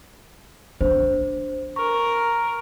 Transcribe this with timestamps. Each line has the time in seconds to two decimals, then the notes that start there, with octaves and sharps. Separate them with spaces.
0.81 D4 C5
1.76 A#4 C#6